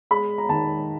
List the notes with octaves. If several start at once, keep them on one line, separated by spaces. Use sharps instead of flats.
G#3 B5
A#5
D#3 A5